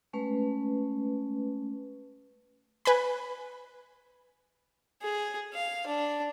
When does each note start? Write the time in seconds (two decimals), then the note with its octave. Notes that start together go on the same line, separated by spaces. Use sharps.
0.13 G#3 A3 C#4 B4
2.85 B4 G#5 B5
5.02 G#4
5.53 F5
5.87 D4